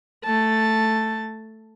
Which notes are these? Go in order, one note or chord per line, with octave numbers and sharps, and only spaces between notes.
A3 A5